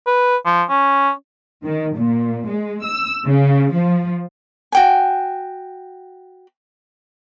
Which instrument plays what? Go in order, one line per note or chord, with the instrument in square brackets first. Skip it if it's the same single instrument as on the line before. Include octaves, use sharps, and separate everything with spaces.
[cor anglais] B4
F3
C#4
[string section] D#3
A#2
G#3
E6
C#3
F3
[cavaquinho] F#4 G5 G#5